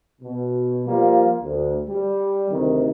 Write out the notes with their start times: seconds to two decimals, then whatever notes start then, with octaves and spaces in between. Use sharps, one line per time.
0.21 B2
0.86 F3 G3 A#3 F4
1.42 D2
1.87 G3
2.50 D2 C3 D#3